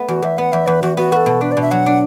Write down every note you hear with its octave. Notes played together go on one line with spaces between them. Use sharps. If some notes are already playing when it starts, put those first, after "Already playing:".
Already playing: A3 B3
E2 F#4
E2 E5
B3 F#5
E2 E5
E2 B4
E2 F#4
B3 F#4
F#4 A4 B4
B2
D4 B4
D5
B2 E5
F#3 F#5
D4